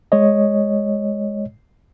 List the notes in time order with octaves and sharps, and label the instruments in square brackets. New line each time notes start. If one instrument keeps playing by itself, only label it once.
[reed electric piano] G#3 C#5 D#5